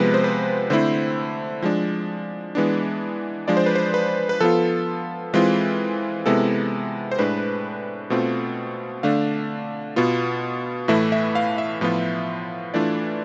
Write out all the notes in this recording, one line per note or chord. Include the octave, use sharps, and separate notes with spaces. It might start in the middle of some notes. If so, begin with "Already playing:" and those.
Already playing: C3 F3 G#3 B3 B4
C5
B4
D3 A3 C4 E4 C5
F3 G#3 D4
E3 G#3 B3 D4
F3 G#3 D4 F4 D5
C5
B4
C5
B4
B4
F3 B3 F4 A4
E3 G#3 C4 F4
C3 G#3 B3 E4 A4
C5
A2 G#3 D4 B4
B2 A3 C4 F4
D3 A3 D4 F5
B2 B3 F4
A2 E3 A3 E4 E5
E5
F5
E5
A2 F3 B3 F4
E3 A3 D4 F4 D5